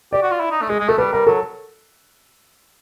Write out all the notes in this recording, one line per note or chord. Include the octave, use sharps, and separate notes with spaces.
G4 D5
F#4
F4
E4
D#4
A3
G#3 G#4
G#3
A3 A4
G3 B4
G3 A#4
F#3 A4